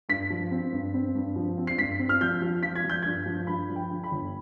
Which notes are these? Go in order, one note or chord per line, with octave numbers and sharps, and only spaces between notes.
G2 B6
F3
C4
G2
C4
G2
F3
C4
C7
G2 B6
C4
F6
F3 G6
F3
F3 B6
G#6
F3
G6
G2 G#6
F3
G2 B5
F3
G5
D3
B5
G1